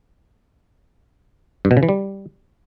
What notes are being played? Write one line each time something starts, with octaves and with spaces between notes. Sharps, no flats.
G2
B2
C#3
E3
G3